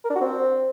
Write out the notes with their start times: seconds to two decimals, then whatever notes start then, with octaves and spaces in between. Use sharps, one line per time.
0.04 A#4
0.10 D4
0.15 F#4
0.21 C4